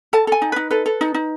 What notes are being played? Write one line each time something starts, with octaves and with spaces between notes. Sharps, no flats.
A4 A5
A4 G#5
D#4
D#4 B4
A4 B4
A4
D#4
D#4